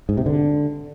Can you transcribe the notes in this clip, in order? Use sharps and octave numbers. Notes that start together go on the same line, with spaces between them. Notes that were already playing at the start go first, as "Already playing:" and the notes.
G#2
C3
D3